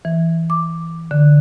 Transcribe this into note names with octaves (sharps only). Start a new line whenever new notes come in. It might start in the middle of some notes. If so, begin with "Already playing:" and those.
E3
D6
D3